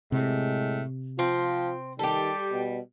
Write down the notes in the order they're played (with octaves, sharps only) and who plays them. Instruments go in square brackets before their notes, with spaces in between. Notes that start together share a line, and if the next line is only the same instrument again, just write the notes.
[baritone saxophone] A2 [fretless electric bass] C3 [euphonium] G#3
[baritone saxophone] F3 [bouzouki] C4 [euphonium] F4
[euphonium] D#3 [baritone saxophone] G3 [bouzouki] G4 A4
[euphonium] B2